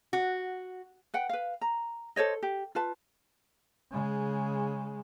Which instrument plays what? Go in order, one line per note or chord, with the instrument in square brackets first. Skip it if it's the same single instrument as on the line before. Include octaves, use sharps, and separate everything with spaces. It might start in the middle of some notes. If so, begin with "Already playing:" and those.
[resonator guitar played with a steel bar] F#4
[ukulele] B4 F#5 G5
B4 F5
A#5
A4 C5 C#5 D#5
G4
F4 B4 A5
[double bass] C#3 G#3